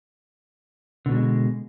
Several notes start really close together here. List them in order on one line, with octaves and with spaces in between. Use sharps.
D3 B2 G3 G#3